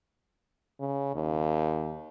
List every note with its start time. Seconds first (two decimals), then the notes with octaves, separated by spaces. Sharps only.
0.80 C#3
1.15 D#2